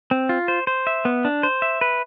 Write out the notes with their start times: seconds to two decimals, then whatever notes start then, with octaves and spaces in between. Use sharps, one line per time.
0.11 C4
0.29 F4
0.48 C5
0.67 C5
0.87 E5
1.05 B3
1.25 D4
1.43 C5
1.62 E5
1.81 B4